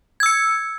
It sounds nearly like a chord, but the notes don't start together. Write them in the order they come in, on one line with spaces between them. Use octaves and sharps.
G#6 E6 C#7